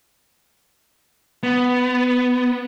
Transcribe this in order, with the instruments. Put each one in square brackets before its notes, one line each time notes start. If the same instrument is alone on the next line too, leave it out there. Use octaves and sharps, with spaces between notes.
[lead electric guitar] B3